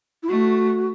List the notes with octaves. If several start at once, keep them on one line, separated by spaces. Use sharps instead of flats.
E4
A3 F#4